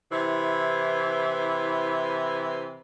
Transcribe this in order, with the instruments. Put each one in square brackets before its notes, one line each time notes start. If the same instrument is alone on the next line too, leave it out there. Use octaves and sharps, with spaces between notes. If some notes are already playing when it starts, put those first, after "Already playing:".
[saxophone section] C3 E3 E4